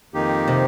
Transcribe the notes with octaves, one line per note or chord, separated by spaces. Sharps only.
F2 D#3 A#3 D#4 G4
C3